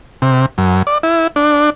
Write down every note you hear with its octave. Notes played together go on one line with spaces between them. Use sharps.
C3
F#2
D5
E4
D4